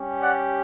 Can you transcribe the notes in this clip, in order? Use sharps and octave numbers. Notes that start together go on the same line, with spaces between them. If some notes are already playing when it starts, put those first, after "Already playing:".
Already playing: G3 C#4 G4
D5 F#5